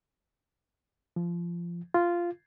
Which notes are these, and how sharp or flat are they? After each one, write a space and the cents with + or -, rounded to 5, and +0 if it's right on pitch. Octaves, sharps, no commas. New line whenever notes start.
F3 -20
F4 -10